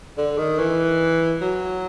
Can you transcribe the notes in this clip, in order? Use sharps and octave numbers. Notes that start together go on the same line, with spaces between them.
D3
D#3
E3
F#3